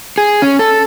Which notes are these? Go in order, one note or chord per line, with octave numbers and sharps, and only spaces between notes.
G#4
C#4
A4